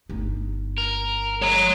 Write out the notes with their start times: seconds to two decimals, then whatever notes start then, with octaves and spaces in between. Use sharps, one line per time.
0.09 G1 D#4
0.78 A#4
1.42 G#3 C#5 A#5